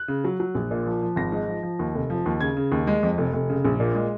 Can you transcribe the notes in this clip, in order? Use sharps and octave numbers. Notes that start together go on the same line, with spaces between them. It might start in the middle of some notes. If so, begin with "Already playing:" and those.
Already playing: F#6
C#3
F#3
F#3
A#1
A#2
F3
F3
G#1 A#6
G#2
F3
F3
D#2
F1
F3
D#2
C#3 G#6
C#3
D#2
G#3
F2
F1
F1
C#3
A#1
A#2
G#3